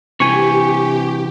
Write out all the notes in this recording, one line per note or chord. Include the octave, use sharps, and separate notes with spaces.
C3 E3 G4 G#5 C#6